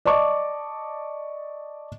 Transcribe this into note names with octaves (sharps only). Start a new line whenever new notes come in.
D5 D#5 A5 C#6 D6